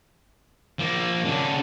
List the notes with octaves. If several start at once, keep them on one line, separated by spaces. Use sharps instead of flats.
F3 A#3
C#3 D4